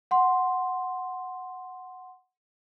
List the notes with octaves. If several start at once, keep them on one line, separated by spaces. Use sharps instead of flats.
F#5 C6